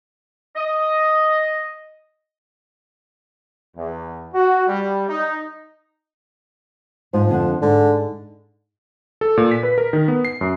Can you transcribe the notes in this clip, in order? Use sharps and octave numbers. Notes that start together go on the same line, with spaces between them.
D#5
E2
F#4
G3
D#4
G#2 F3
F2 D3 F#5
G#2 D3
A4
A#2
B6
B4
A#4
D#3
B3
C7
F#2